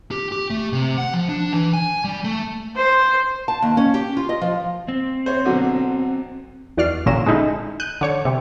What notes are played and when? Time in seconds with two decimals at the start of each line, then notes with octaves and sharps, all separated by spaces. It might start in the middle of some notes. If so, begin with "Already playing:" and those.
0.11 G4
0.32 G4
0.50 A3
0.73 C3
0.98 F#5
1.14 F3
1.29 D4
1.52 E3
1.73 G#5
2.04 G3
2.24 A3
2.76 C5
3.48 A5
3.62 D#2
3.77 C#4
3.94 G4
4.17 F4
4.29 D#5
4.41 F3
4.88 C4
5.26 C5 C#5
5.45 B2 D3 F#3
6.77 E2 F#4 D5 F6 C7
7.06 A1 A#2 D3 C#4 A#4 E7
7.26 G#3 A3 D#4 E4
7.80 F#6 G6 D#7
8.01 D3 C#5 C#6
8.25 C3 G3